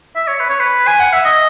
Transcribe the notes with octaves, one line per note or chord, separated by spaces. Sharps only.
E5
C#5
B4
C#5
B4
G#5
F#5
E5
D#5